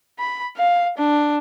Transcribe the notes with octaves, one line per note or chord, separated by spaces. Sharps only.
B5
F5
D4